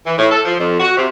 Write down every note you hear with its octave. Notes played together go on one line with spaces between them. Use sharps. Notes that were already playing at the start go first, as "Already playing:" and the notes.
E3
A2
A4
F3
F2
F#4
C3